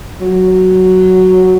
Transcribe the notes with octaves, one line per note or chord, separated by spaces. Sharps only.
F#3